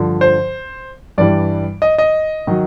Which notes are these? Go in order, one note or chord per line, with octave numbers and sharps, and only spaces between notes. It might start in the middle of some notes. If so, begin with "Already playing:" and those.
Already playing: G2 D3 F3
C5
G2 E3 G3 D5
D#5
D#5
D#3 F#3